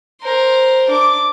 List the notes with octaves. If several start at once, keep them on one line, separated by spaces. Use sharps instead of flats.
A#4 C5
D4 D6